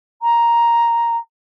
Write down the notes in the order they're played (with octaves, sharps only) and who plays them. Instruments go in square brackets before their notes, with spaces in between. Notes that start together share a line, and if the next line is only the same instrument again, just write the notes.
[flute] A#5